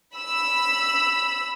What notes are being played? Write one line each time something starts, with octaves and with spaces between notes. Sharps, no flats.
B5 E6